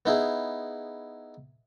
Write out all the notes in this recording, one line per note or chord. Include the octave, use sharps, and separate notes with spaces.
B3 D#4 E4 G#4